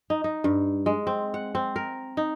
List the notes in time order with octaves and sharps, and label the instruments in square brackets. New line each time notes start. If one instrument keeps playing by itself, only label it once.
[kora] D#4
D#4
G2
G#3
C4
F#5
C4
A#4
D#4